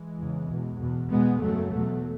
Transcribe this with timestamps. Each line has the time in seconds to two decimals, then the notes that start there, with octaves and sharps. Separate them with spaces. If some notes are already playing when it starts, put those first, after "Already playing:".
Already playing: E3 G#3
0.18 E2 C#3
0.49 E2 B2
0.79 E2 B2
1.10 E2 B2 G#3 B3
1.40 F#2 C#3 F#3 A3
1.71 E2 B2 F#3 A3